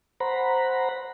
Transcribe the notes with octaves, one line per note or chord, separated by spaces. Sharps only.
C5 F#5 A#5 B5